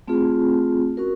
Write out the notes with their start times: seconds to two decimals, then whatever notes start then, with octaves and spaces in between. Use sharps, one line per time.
0.08 A3 C4 F4 G#4
0.97 C#4 F#4 A#4